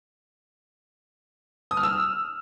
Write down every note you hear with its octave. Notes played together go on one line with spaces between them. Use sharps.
D#6
F6
E6